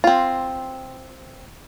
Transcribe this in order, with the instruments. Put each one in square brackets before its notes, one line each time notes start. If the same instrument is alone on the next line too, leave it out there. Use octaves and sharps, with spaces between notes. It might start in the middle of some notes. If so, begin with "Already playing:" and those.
[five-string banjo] C4 F4